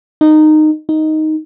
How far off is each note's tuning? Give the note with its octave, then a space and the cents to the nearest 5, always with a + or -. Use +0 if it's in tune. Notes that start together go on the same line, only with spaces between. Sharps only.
D#4 -15
D#4 +5